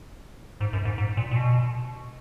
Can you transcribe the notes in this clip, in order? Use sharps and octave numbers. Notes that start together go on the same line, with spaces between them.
G#2
F#2
G#2
G#2
A#2
A#2
B2